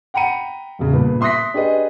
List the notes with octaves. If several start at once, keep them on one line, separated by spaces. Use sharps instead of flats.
F#5 G5 A#5 B5 C#7 D#7
E1 C#3
G2 A#2 B4
E5 C6 D#6 F#6 A#6 B6
D4 G4 G#4 B4 D#5